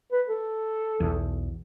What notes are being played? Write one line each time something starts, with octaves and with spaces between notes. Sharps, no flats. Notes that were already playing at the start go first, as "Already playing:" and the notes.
B4
A4
B1 E2